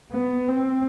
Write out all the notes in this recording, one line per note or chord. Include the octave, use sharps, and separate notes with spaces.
B3
C4